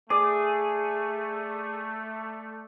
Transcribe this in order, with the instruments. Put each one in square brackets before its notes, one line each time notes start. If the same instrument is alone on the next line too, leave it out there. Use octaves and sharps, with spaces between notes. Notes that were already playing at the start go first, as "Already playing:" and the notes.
[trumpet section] A3 [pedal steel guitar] G#4 [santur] D5